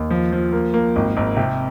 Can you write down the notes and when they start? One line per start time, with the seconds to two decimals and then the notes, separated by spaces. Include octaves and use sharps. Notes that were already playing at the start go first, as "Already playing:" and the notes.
Already playing: D#2
0.10 F3
0.32 F3
0.52 A#3
0.74 A#3
0.96 G#1
1.17 G#1
1.37 C3